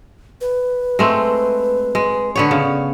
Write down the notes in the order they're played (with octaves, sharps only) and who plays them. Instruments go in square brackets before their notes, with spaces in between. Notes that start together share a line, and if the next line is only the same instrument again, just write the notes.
[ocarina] B4
[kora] G#3 A3 C4
G#3
D3 B3 C#5
C#3